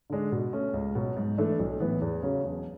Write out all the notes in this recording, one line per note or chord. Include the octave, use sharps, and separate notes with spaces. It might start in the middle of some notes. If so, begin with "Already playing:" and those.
D3 G#3 D4
B2
A3 C#4
C#2
B2 F#3
G#2
E3 A3 D4 A4
B1
A2 E3 B3
E2
C#3 F#3
E1